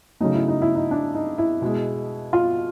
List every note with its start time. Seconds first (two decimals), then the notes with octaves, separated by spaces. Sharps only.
0.20 C#3 F#3 A3 D#4
0.34 E4
0.48 D#4
0.62 E4
0.75 D#4
0.91 D4
1.15 D#4
1.38 E4
1.62 B2 G#3
2.33 F4